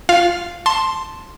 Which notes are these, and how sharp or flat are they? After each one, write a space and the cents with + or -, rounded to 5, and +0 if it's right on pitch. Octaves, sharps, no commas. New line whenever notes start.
F4 +0 F5 -10
A5 +0 C6 +0